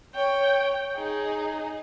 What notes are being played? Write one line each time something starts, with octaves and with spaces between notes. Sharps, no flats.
C#5 G5
D#4 G#4